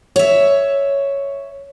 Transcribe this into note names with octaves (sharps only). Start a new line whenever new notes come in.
C#5 E5